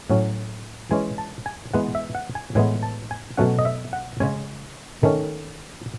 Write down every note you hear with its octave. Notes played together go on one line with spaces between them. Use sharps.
A2 F#3 C#4
E3 G#3 C#4 G#5
A5
G#5
E3 G#3 B3 F#5
E5
F#5
G#5
A2 E3 G#3 B3 G#5
A5
G#5
B2 F#3 A3 C#4 F#5
D#5
E5
F#5
C#3 G#3 C#4 G#5
D#3 A3 C#4